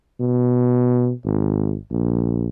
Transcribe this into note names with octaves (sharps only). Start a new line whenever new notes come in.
B2
G#1
A#1